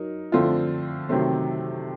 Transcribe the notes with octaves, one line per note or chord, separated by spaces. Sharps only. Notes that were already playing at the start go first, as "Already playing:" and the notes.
Already playing: F#3 D#4 A#4
D3 F3 A3 C4 F4
C3 D#3 F#3 A3 C4